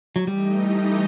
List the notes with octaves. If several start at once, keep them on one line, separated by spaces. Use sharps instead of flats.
F#3
E3 G3 A3 D#4 G4 D#5